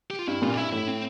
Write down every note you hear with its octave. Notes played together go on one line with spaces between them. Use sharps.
G4
F4
G2 E4
G2 A#2 F4
D4
G2 E4
A2 E4
C4